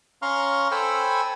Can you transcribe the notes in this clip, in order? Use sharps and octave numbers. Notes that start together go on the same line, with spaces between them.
C#4 F5 A#5 C6 C#6 F6
A4 C5 G5 G#5 B5 E6